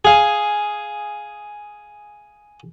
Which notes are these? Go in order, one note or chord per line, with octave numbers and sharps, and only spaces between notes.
G#4 F5